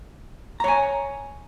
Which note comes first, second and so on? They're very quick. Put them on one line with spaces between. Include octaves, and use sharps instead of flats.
A#5 C#5 G#5